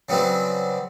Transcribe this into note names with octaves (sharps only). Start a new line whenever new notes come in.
C#3 F#3 G3 B3 C4